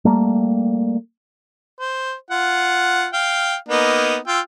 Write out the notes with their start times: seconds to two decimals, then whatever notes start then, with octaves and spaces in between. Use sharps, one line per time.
0.05 G3 A3 A#3
1.80 C5
2.30 F4 F#5
3.13 F5 G5
3.68 A#3 B3 D#4
4.27 F4 G5 E6